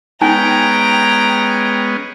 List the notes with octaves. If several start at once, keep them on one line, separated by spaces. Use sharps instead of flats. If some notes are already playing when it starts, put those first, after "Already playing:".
G#3 B3 C#4 D#4 G5 G#5 A#5